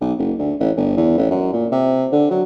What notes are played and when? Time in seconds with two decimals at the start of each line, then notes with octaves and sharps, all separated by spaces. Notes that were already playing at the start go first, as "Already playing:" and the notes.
0.01 B1
0.18 F#1
0.38 D2
0.60 A1
0.77 G1
0.97 E2
1.18 A1
1.31 F#2
1.53 A#2
1.72 C3
2.12 D3
2.30 F#3